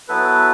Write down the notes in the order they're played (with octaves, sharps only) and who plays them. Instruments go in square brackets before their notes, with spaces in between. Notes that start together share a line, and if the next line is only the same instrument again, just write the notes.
[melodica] F#3 B3 E4 A4 [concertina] B4